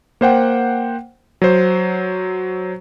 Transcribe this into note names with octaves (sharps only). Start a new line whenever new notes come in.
A#3 C5 F#5 G5
F#3 C5